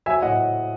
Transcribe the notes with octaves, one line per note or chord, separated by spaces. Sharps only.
F#3 E5 G#5
A2 D#5 F#5